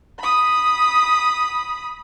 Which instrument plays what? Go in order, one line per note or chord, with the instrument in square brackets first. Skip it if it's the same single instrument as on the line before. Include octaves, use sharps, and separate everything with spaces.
[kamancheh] B5 D#6